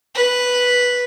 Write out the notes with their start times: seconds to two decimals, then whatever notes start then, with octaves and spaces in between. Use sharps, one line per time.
0.15 B4